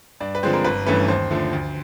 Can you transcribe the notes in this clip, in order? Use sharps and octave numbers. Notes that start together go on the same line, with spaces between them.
G2 D5
B4
D3 F3 G#3 C4 C5
A#4
G1 B4
G2 E3 A3 C#4 B4
D#2 C5
D3 F3 A3
D2